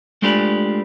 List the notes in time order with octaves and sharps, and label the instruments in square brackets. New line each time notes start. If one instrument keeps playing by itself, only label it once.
[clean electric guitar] G#3 A3 D4 F4 G4 B4